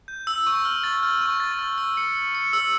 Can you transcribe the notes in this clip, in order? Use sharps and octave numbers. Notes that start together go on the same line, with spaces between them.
G6
E6
C#6
F6
A6
F6
C#6
A6
F6
E6
C#7
C#7
C#7
E6